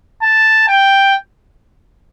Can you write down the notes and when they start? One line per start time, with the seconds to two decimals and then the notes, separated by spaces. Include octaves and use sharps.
0.23 A5
0.68 G5